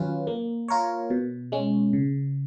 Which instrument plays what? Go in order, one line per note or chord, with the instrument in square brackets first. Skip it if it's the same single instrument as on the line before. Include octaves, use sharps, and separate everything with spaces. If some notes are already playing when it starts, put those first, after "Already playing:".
Already playing: [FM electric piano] D#3 F#3 C#4 F4 B4
A#3
F4 A#4 C#5
B2
G#3 C#4
C#3